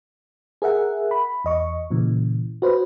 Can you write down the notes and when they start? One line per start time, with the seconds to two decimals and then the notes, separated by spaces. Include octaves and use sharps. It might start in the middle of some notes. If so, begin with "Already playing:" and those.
0.62 G#4 A#4 E5 F#5
1.11 B5
1.45 E2 D#5 C#6
1.91 A#2 C#3 E3
2.62 F#4 B4 C5